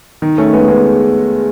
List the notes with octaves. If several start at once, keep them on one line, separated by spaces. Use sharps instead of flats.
D#3
A3 C#4
G#3 B3
G#3 B3